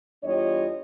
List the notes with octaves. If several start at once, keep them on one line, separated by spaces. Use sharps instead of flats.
E2 G3 D4 F4 C#5 D#5